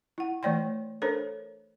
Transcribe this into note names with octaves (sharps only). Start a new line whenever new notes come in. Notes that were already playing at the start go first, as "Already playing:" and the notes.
E4 F#5
E3 A3 C#5 D5 G5 C6
D4 A4 A#4 C5 C#5